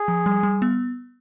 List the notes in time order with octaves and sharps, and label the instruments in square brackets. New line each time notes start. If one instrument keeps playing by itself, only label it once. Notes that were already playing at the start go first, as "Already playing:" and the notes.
Already playing: [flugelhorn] G#4
[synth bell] F3
G3
G3
B3